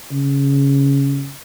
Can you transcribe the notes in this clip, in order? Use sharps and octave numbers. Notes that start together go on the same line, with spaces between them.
C#3